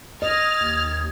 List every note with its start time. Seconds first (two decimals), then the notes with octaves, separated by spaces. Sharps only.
0.22 D#5 D#6 F6 G#6 A6
0.61 D#2